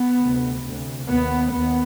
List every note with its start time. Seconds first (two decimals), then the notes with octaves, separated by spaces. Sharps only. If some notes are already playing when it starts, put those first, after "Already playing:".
Already playing: B3
0.20 D2 C3
0.64 D2
0.69 C3
1.08 D#2 B3
1.53 D#2 B3